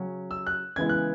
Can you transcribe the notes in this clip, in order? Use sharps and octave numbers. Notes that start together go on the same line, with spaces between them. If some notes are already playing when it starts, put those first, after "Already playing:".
Already playing: C#3 F#3 C#4
E6
F#6
C#3 E3 G#3 B3 E4 G#6
F#6